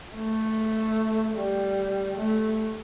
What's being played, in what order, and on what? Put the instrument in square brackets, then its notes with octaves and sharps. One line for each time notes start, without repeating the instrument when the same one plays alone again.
[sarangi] A3
G3
A3